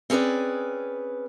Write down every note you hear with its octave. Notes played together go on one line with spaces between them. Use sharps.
C4 C#4 G#4 B4 D5